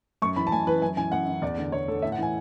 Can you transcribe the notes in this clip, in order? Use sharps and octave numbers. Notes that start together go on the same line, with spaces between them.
F#2 C#6
E3 B5
A5
F#2 G#5
E3 B4
F#2 G#5
E3 G#5
F#2 F#5
E3
E2 D5
D3
E2 C#5
D3 A4
A2 E5
F#5
E3 G#5